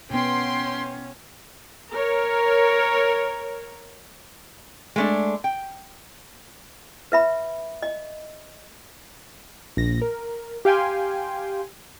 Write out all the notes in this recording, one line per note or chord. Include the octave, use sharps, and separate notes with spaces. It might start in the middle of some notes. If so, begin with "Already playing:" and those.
B2 B3 C#4 G5 C6
A#4 C#5
G#3 A3 D4
G5
B4 E5 B5
D#5
A#1 A#6
A#4
G4 F5 G5 G#5 C6